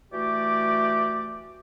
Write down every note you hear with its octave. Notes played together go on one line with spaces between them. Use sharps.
E3 A3 F#4 G4 D5